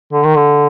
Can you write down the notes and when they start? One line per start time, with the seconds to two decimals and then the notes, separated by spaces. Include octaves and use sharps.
0.13 D3
0.24 D#3
0.36 D3